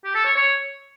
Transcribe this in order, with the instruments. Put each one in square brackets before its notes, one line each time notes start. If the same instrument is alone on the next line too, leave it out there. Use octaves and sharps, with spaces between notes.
[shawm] G4
A4
C#5
C#5